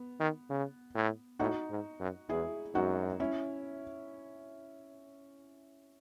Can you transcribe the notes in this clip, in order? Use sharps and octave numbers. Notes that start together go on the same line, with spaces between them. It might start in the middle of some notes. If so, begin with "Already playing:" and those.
Already playing: B3
D#3
C#3
A2
A2 D#4 F#4
G#2
F#2
E2 E4 G#4
F#2 D#4 F#4
C#4 E4